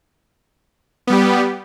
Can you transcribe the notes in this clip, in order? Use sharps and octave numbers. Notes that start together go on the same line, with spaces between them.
G3 B3 G4